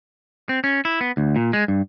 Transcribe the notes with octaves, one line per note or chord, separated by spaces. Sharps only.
C4
C#4
E4
B3
D2
A#2
G#3
G2